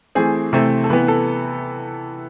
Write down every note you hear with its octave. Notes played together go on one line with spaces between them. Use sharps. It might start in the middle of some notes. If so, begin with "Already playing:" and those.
E3 A3 C4 G#4
C3 E3 A3 C4
A4
C3 E3 B3 B4
A4